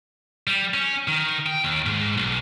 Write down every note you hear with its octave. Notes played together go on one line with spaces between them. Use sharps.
G3
C#4
D#3
G5
D#2
G#2
B1